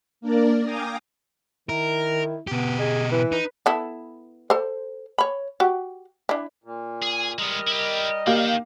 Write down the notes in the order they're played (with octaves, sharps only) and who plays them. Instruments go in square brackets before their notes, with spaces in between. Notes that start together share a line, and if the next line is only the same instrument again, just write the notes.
[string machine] A#3 D4 A#4 D5
F5 G5 G#5 A#5 D6 D#6
[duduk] D#3 [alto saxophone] E4 [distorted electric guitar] A#4
[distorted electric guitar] B2 G4 [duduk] B3
[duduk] G#4 [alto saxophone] D#5
[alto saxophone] E3 [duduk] B4
[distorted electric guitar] D#4 [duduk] B4
[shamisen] B3 E4 A4
A4 C5
C#5 B5
F#4 G4
D4 E4
[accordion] A#2
[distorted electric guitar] G#4
[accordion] G3 A#4 D#5 [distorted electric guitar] G#3 B3
[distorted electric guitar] E4 G4
[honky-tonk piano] A#3 G4 F5 [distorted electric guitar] D#4 G5